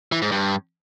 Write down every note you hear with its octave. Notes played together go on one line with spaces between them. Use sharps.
E3
G#2
G2